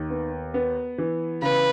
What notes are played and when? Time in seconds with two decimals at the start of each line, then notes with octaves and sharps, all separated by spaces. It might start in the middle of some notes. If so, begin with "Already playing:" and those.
Already playing: D#2 D#3
0.10 B3
0.54 B3
0.98 E3
1.42 C#3 B4